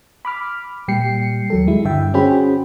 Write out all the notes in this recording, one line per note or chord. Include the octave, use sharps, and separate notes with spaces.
B5 D6 F6
A#2 G3 G5 C7 C#7
D#2 F#3 A4
G#3 E4
G2 D3 E5 G5
C#4 F#4 G#4 C5 G5 B5